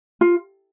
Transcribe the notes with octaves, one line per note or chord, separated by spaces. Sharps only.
F4